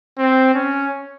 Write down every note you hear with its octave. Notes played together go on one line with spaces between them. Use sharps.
C4
C#4